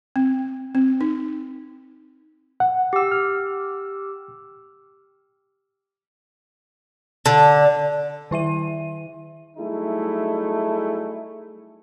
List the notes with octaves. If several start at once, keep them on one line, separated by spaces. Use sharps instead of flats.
C4
C4
D#4
F#5
G4 E6
F6
D3
D#3 E4 E5 D#7
F#3 G3 A3 D#4 E4 G#4